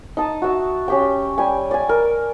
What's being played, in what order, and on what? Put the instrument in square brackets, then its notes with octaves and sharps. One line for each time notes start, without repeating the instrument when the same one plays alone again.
[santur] D#4 A5 D#6
F#4 E5 E6
C#4 G4 G5
G3 G5 G#5
D5 G#5
A#4